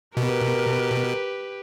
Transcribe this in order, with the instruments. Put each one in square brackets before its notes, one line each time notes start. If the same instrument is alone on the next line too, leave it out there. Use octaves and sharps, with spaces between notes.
[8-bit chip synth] B2 [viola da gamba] G4 B4 [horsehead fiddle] A#4